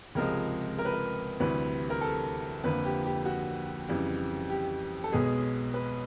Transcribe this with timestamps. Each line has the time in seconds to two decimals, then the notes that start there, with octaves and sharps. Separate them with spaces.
0.15 C#2 C3 F3 G#3 A#4
0.78 A#4
0.85 B4
0.93 A#4
1.40 D2 C3 E3 G3 B4
1.90 A#4
2.01 A4
2.64 F2 D3 F3 A#3 B4
2.85 G4
3.05 G4
3.25 F#4
3.88 F2 C#3 E3 G3
4.50 G4
5.04 A4
5.12 B1 B2 G#3 B3 G#4
5.74 B4